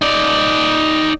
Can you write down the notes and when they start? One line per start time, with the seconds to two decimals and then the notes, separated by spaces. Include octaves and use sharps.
0.02 D#4 D5